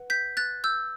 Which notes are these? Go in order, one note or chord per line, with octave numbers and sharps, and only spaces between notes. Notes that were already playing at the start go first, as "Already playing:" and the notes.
Already playing: B4 F#5
G6 B6
F#6 A6
E6 G6